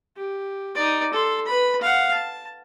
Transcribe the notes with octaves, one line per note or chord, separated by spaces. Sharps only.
G4
D#4 D5
A4 C6
B4 B5
F5 F#5
A5